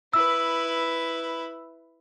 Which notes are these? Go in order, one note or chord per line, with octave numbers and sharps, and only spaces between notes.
E4 B4 E6